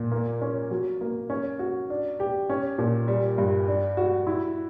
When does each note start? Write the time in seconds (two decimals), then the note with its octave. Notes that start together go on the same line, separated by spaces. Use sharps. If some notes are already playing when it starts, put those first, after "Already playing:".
Already playing: A#2
0.12 A#3
0.41 C#4
0.71 F#3
1.01 A#3
1.30 C#4
1.59 F#4
1.90 D4
2.20 G4
2.49 C#4
2.78 A#2
3.08 G3
3.38 G2
3.68 D4
3.97 F#4
4.27 E4